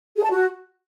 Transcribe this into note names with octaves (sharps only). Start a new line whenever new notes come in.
G#4
A5
F#4